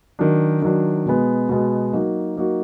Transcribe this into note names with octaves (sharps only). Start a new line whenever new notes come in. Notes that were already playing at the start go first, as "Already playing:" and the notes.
D#3 F#3 D4
D#3 F#3 D4
B2 G#3 B3
B2 G#3 B3
F#3 A#3 D#4 F#4
F#3 A#3 D#4 F#4